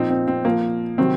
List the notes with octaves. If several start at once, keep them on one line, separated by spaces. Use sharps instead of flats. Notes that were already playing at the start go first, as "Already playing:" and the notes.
Already playing: A#2 F3 C4 D#4
C4
C4
A#2 F3 A#3
C3 D#3 F#3 C4